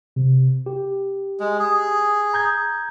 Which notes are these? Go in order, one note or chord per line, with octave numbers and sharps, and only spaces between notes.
C3
G4
G#3
G#4
A#5 G6 G#6